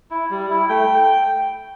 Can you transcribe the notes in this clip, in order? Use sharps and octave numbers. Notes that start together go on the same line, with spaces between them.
E4
G3
E4
A3 G5